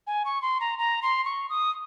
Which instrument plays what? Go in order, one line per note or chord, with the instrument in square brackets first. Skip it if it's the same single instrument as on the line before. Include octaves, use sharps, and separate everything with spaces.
[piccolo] G#5
C#6
C6
A#5
A#5
C6
C#6
D#6